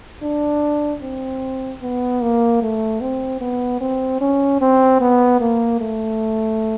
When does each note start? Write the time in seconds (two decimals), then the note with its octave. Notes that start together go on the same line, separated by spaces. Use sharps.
0.22 D4
1.02 C4
1.82 B3
2.21 A#3
2.62 A3
3.01 C4
3.41 B3
3.81 C4
4.21 C#4
4.61 C4
5.01 B3
5.40 A#3
5.81 A3